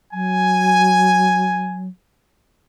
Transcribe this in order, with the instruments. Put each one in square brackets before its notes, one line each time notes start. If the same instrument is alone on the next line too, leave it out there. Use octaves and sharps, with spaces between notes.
[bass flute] F#3 [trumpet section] G#5